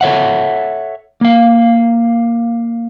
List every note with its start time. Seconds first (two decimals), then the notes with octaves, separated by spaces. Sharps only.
0.01 A4 C#5 E5 F#5
1.21 A#3 F5